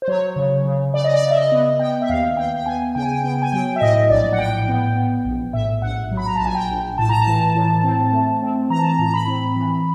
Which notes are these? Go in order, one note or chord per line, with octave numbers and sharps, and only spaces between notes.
C5
F#3 C#5
C#3
C#3
C#3 D5
D#5
D5
C#3
E5
D#5
B3
B3 G5
E5
D#2 F5
B3 G5
G5
B3 G#5
C#3 G5
G#5
G5
B3 G5
G#5
F#3 G5
E5
A2 D#5
A#1 D5
F#5
A2 G5
B3
B3
A#1
A2 E5
A#1 F#5
F#3
B5
A#5
A#1 A5
G#5
G5
A#1
A2 A5
A#5
A5
E3
A2
C4
A3
C4
E3 A#5
A5
A#5
A2 A#5
B5
C4
E3